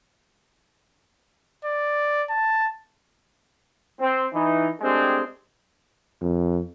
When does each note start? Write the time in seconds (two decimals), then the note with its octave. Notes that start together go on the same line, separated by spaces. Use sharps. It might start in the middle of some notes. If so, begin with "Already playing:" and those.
1.65 D5
2.30 A5
4.00 C4
4.33 E3 D#4
4.81 G#3 A3 C4 D4 G4 G#4
6.21 F2